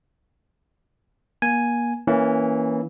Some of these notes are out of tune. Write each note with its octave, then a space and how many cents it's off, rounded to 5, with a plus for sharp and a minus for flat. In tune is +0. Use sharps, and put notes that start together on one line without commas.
A#3 +30 G#5 +0
E3 -15 A#3 +0 C#4 +0